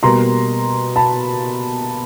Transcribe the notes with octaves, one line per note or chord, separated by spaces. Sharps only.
B2 G3 A#3 A#5 C6
A5 B5